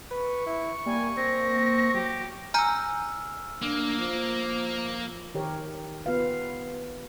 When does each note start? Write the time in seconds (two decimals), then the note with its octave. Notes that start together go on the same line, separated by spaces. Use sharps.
0.11 B4 C#6
0.46 E4
0.86 G3 A#3 G#5
1.17 C4 A#6
1.94 F#3 G4
2.54 G#5 A#5 E6 F6 G6
3.62 A#3 D4
3.99 F3
5.35 D#3 G4 A#4 C#5
6.06 B3 F4 B4 F5